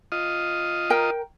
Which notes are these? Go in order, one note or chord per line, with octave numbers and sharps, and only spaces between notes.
F4 D#5
A#4 G5